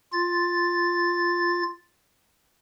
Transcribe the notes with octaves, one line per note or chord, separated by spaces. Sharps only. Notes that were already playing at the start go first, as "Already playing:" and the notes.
F4 A6